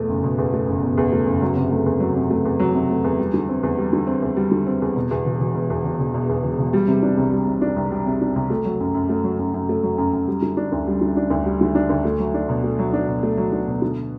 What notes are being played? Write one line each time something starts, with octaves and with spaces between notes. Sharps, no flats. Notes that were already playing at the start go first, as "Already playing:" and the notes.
Already playing: E2 B2 A3
F#1
B2
E2
A3
F#1
B2
E2
A3
F#1
F#3
C3
A3
E2
F#3
C3
A3
E2
F#3
C3
A3
E2
G3
D3
C4
E2
G3
D3
C4
E2
G3
D3
C4
E2
B2
E2
E1
E1
B2
E2
E1
E1
B2
E2
E1
E1
G3
C3
D4
C2
G3
C3
D4
C2
G3
C3
D4
C2
A3
F#3
F#2
F#2
A3
F#3
F#2
F#2
A3
F#3
F#2
F#2
G3
D3
D4
D2
G3
D3
D4
D2
G3
D3
D4
D2
A3
F#3
D4
B2
A3
F#3
D4
B2
A3
F#3
D4
B2
D3